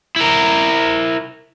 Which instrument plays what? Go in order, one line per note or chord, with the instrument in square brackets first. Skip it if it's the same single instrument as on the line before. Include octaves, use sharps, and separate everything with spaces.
[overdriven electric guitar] E4 A#4